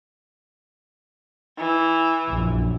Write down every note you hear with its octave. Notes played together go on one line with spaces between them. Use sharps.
E3
A#1 F#2